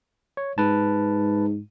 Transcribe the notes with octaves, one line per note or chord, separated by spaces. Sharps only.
C#5
G#2 B4 A5